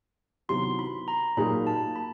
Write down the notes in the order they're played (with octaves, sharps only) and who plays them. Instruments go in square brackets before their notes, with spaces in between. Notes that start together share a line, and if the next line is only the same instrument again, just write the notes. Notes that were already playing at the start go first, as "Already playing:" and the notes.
[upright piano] C3 D#3 F#3 B3 E4 [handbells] C6
[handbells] B5
A#5
[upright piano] A#2 F#3 A#3 D#4 G#4 [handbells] B5
[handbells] A5
B5